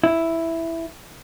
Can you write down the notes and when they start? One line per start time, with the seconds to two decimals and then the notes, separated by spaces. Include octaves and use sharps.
0.03 E4